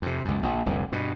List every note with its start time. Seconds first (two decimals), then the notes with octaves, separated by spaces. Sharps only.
0.02 F2 C3
0.25 C#2 F#2
0.43 A#1
0.66 F1 C2 F2 D3
0.92 G2 B2